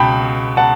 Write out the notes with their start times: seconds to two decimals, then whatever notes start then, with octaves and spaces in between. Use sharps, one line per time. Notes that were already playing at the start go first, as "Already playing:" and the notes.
Already playing: C#2 B2 G5 A5 B5
0.57 F#5 A5